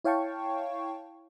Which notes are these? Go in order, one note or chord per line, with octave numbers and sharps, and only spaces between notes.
E4 C#5 F5 G5 A5 C#6